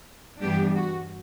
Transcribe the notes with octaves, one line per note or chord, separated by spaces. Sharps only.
G2 E3 G3 B3 D4 G4
F#4